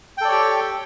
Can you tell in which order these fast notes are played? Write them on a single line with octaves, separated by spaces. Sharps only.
G5 A4 D5 C#5 G4